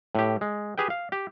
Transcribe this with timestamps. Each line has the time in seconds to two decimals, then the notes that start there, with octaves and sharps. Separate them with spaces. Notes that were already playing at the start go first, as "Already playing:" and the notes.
0.15 A2 G4
0.41 G#3
0.78 G4 G#4 B4 G5
0.90 F5
1.12 G4